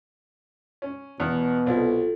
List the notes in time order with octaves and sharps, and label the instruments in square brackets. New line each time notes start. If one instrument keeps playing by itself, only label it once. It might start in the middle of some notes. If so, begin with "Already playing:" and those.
[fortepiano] C#4
[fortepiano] E2 [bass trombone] B2
[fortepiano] C2 [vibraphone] F4 F#4 A4